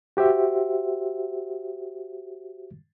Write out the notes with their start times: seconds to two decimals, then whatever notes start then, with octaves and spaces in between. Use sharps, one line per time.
0.17 F#4 G4 C5 E5